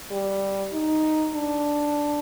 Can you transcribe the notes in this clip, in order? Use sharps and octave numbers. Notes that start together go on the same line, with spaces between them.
G3
D#4
D4